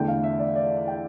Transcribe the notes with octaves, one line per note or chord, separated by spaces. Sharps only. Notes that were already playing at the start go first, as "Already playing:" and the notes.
Already playing: E2 D3 A3 G5
F5
E5
D5
D5
G5